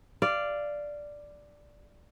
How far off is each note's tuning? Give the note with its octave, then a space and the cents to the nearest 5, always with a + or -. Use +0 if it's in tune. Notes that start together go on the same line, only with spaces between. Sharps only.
D5 +0 F5 -15